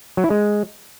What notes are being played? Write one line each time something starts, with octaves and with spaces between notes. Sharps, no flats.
F#3
E4
G#3